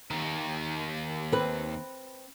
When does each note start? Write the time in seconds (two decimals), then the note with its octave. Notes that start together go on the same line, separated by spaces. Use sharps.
0.11 D#2 D#3
1.32 C4 B4